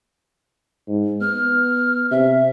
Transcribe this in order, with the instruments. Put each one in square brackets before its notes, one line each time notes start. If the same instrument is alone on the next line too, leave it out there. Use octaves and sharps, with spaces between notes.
[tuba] G#2
[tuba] B3 [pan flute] F6
[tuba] C3 [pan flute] E5